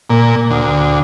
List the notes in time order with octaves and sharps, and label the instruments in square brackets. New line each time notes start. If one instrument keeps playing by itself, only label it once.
[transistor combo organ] A#2
D2